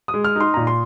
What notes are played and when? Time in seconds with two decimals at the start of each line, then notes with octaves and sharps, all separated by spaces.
0.08 D#6
0.14 G#3
0.24 F6
0.36 D#4 C6
0.54 A#2 A#5
0.67 C6